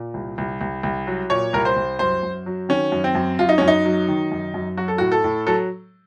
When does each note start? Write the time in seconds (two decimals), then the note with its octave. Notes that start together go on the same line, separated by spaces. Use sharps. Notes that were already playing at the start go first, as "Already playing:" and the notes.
Already playing: A#2
0.14 C2
0.38 C2
0.61 C2
0.83 C2
1.07 F#3
1.30 A#2 C#5
1.53 C2 A#4
1.65 C5
1.76 C2
1.99 F#2 C5
2.23 F#2
2.46 F#3
2.69 D#3 C#4
2.92 F#2
3.04 C4
3.15 F#2
3.39 F#2 F4
3.49 D#4
3.58 F#2 C#4
3.68 D#4
3.85 F#3
4.08 D#3
4.32 F#2
4.54 F#2
4.77 F#3 F#4
4.88 A4
4.98 A2 F#4
5.12 A4
5.24 A2
5.47 F#3 A4